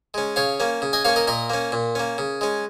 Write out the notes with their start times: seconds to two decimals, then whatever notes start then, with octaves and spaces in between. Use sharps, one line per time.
0.14 G#3 C#4
0.36 C#3 C#5 F5
0.60 A#3 C#4
0.82 C#3
0.93 D#5 G#5
1.05 A#3 C#5 F5
1.08 C#4
1.16 A#4 D#5
1.27 A#2 A#4 D#5
1.50 A#3 C#4
1.72 A#2
1.95 A#3 C#4
2.18 C#3
2.41 G#3 C#4